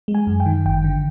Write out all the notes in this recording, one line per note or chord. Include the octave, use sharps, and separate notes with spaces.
G#3
G#5
F#2
G5
D#3
G1 G5
D3